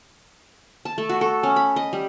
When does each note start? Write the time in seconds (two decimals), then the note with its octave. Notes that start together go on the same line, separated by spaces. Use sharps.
0.85 A5
0.98 A3
1.09 F#4
1.21 A4
1.43 C#4
1.56 B5
1.76 D#5
1.93 G3